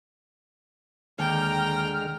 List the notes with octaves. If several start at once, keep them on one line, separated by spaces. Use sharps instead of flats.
D#2 D3 G#3 G5 A#5 F6